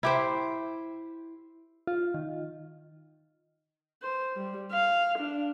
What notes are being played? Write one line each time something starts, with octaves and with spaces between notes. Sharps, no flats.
E4 G4 C5
F4
D#3
C5
G3
F5
D4